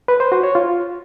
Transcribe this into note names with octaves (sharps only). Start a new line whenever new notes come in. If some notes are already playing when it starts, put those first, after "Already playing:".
B4
C5
F#4
C#5
F4